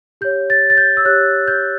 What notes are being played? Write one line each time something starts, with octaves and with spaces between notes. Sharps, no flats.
G4 C#5 G6
A6
A6
G6
E6
G4 C#5 F#6
G6